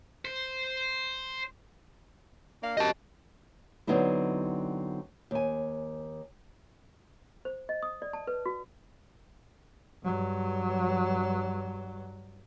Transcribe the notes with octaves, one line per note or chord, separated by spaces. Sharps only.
C5
A#3 D4 F5
F#2 G4 D#5 A5
D3 F#3 B3 C4 D#4 E4
D#2 G#5
C5
D#5
D#6
D5
A5
B4
F#4
G2 F#3